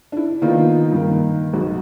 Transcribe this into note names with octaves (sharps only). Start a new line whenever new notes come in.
D4 E4
D#3 A#3 B3 D#4 F4
G2 D#3 A#3
B1 F#4